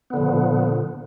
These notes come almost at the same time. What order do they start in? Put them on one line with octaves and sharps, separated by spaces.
B3 D3 F3 A#2